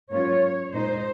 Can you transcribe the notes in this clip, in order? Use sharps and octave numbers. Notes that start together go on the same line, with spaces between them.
G#2 F#3 A#3 C#4 F4 C#5
A#2 G#3 D#4 C5